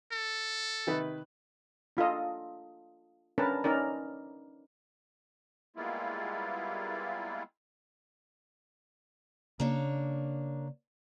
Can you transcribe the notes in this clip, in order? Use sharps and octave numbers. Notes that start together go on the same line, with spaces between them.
A4
C3 D#3 B4
D4 F4 A4 D#5
C#4 D4 A#4 B4 A5
C#4 D#4 A#4 D5
G3 G#3 A#3 B3 E4 F4
C#3 A#3 D4 C#5